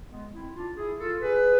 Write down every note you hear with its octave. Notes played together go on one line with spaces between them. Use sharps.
G#3 B3
C4 E4
D4 F4
E4 G#4
F4 A4
G#4 B4